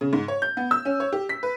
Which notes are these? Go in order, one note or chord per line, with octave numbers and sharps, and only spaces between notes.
C#3
G#2
C#5
G6
B3
E6
C#4
C#5
G4
B6
B4